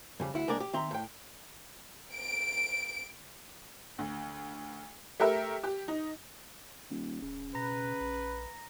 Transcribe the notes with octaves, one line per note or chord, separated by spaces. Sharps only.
F2 C#3 G3
D2 E4 F#5
C2 G#3 A#3 D4 A#4 D5
G4
D#3 C4 E5 A#5 C6
A2 G5
D7
D2
A3 G4 A#4 E5
G4
D#4
D#1
D1 C#3
B2 B4 A#5 A#6
A#1